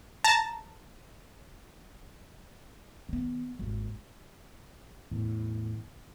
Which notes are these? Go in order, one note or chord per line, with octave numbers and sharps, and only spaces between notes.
A5 A#5
D#3 B3
G#1 D#2
E2 A2